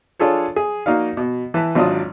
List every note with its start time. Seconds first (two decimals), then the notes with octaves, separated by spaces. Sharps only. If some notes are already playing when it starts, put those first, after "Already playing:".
0.19 D4 F4 G#4 A4 C#5
0.56 G#4
0.86 A#3 D#4 F#4 D5 F5
1.17 B2
1.54 E3 B4 A5
1.75 G#1 F#3 D4 F4 D5 D#6